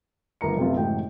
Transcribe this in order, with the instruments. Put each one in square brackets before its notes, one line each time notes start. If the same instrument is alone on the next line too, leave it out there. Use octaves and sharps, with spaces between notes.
[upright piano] G1 A#4 A#5 C#7
F#2 C3 A3 B3 F4
A1 F#2 C3 F#3 G#3 G5